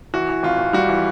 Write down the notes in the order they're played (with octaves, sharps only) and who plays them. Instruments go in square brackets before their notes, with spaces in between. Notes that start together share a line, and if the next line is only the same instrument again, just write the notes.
[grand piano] E3 F#4
E3
G#1 F4
G#1
G3 F#4
E3